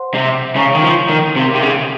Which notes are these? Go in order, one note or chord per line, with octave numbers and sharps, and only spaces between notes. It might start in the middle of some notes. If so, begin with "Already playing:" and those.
Already playing: C5 F#5 C6
C3
C#3 C#5 F5 A#5 C#6
D#3
F3
D#3
C3 A#4 F5 C6
C3
C#3